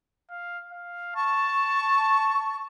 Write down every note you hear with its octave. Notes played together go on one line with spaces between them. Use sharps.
F5
F5
A5 C#6